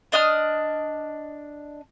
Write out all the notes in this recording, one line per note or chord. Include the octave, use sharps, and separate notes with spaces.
D4 D#5 D#6 F6